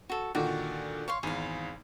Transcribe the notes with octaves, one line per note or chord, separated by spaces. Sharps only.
F#4 A4
A#2 D3 D#3 F#4 D5
C#5 F5 C6 C#6
G#1 E2 G#4 F5